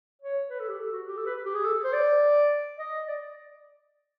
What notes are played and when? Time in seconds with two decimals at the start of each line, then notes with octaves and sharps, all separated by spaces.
0.22 C#5
0.50 B4
0.59 A4
0.68 G4
0.79 A4
0.92 F#4
1.07 G4
1.17 A4
1.26 B4
1.45 G4
1.54 G#4
1.64 A4
1.84 C5
1.93 D5
2.79 D#5
3.08 D5